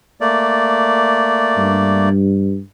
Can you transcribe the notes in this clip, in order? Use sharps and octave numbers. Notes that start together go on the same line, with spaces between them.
A3 A#3 D5
G2